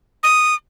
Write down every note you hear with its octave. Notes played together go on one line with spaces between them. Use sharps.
D#6